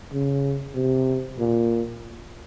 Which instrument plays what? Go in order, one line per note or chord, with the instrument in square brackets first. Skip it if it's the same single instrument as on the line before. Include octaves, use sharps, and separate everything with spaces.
[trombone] C#3
C3
A#2